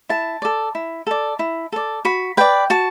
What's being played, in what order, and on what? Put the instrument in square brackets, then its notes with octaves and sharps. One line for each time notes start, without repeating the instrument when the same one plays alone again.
[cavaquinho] E4 A5
A4 D5
E4
A4 D5
E4
A4 D5
F#4 B5
B4 D5 G5
F#4 A5